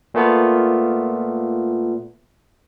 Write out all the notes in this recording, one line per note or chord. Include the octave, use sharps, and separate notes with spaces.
A#2 A3 B3 F4